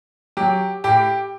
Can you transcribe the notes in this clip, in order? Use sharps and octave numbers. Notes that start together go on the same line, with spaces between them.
F#3 G4
A2 G4